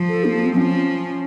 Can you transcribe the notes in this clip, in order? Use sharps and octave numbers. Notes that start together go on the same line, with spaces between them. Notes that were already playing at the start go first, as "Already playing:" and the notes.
Already playing: F3
A4
A#3
A#3
C4
F3 C#4